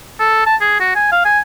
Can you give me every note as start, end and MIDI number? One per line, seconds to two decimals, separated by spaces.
0.19 0.45 69
0.46 0.56 81
0.61 0.78 68
0.80 0.94 66
0.95 1.07 80
1.12 1.20 77
1.25 1.40 80